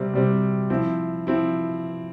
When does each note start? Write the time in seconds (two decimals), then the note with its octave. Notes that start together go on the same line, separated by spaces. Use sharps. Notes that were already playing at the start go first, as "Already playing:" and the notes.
Already playing: C3 G3 C4
0.13 C3 G3 C4
0.70 F3 C4 E4
1.27 F3 C4 E4